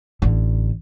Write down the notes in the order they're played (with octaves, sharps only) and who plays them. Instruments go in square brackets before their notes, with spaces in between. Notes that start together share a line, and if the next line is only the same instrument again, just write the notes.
[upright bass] A1 D3